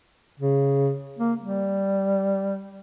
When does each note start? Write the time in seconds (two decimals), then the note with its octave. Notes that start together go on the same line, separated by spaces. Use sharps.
0.39 C#3
1.19 A#3
1.40 G3